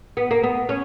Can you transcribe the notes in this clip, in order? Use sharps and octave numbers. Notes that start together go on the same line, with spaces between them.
B3
A#3
B3
C#4